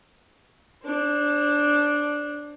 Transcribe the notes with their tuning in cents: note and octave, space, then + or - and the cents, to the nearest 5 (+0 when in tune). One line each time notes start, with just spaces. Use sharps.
D4 -5 C5 +35